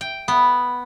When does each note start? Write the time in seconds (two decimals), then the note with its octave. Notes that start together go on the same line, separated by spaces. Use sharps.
0.01 G5
0.28 B3